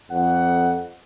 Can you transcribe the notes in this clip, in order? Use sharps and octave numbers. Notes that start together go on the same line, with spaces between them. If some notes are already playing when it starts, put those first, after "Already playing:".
F2 F#5